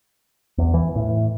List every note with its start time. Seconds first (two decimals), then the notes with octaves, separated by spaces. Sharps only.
0.58 E2
0.74 E3
0.96 A2